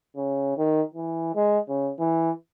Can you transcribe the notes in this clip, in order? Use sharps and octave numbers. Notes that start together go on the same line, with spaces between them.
C#3
D#3
E3
G#3
C#3
E3